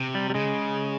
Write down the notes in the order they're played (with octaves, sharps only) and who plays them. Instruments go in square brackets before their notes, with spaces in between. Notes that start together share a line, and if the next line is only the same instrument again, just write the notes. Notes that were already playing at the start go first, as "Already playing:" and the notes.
Already playing: [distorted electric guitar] C3
[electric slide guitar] G3
G3
[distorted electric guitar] C#3 [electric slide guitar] G#3